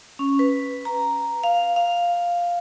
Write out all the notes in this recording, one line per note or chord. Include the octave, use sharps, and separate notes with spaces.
C#4
B4
A#5
F5
F5